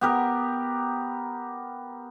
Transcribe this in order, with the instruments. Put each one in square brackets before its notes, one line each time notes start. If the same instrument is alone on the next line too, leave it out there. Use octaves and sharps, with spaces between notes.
[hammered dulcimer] B3 G4 A#4